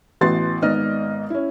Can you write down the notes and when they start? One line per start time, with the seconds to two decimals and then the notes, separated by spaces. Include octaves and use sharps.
0.21 A1 E3 B3 F#4 C6 A6
0.62 G#1 G#2 B3 D5 D#5 F6
1.30 C#4 E4